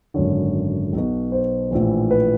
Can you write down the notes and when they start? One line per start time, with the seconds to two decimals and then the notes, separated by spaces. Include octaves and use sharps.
0.14 G#1 F#2 D3 C#5
0.92 B1 B2
1.32 C5
1.71 A#1 A2 E3
2.11 B4